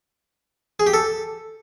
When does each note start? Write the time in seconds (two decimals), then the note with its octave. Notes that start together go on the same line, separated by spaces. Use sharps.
0.80 G#4
0.87 G4
0.94 A4